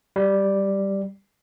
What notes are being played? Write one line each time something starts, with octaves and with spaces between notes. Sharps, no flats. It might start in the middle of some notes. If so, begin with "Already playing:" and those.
G3